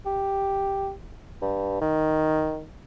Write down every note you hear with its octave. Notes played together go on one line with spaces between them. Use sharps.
G4
G2
D#3